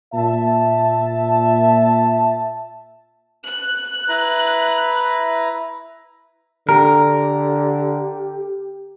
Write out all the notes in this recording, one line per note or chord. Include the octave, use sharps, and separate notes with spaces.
A#2 E5 A5
F#6
E4 B4 A#5
D3 G4 A#4